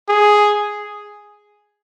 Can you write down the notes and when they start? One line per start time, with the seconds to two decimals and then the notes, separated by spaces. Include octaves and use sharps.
0.09 G#4